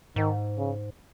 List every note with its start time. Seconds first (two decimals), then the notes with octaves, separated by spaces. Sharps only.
0.16 G#2 D#3
0.58 C#3